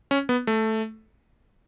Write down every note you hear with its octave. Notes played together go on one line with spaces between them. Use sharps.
C#4
B3
A3